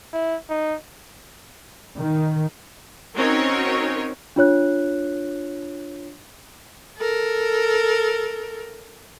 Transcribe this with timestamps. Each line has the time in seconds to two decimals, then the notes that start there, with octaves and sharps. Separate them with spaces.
0.13 E4
0.49 D#4
1.99 D#3
3.16 C4 C#4 D#4 F#4 A#4 C#5
4.36 D4 F4 C#5 F#6
6.98 A4 A#4